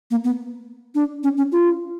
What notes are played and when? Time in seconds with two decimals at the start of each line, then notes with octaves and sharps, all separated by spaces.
0.11 A#3
0.24 B3
0.95 D4
1.23 C#4
1.37 C#4
1.52 F4